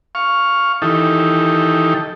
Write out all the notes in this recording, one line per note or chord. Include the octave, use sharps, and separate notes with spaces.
F5 C#6
D#3 E3 D#4 G4 A4